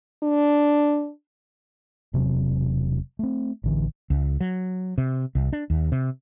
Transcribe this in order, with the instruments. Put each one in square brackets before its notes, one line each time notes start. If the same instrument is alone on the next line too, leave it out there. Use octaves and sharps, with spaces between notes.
[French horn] D4
[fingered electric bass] E1 C3 F#3
A3 C4
A1 D3 E3
[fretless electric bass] C#2
F#3
C3
C2
D4
D#2
C3